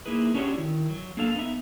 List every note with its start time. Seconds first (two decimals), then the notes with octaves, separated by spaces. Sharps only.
0.06 A#3 D#4 E4 G#4 B4
0.34 C#4 D4 F#4 G4 A#4 C#5
0.54 D#3 E4
0.90 F#3
1.17 A#3 D4 A4 F5
1.36 B3 D#4 E5